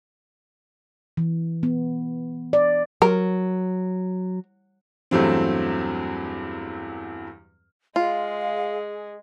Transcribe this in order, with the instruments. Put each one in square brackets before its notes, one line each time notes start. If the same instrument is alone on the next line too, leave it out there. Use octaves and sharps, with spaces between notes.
[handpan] E3
B3
D5
[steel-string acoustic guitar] F#3 [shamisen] A#4
[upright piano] E2 G2 F#3 A3 C4
[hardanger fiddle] G#3 [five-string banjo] F4 [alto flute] G#4 [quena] F5